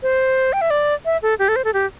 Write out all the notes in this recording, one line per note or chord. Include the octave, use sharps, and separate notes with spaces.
C5
G5
E5
D5
E5
A4
G4
A4
C5
A4
G4